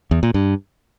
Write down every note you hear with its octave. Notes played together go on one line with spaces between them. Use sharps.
E2
A#2
G2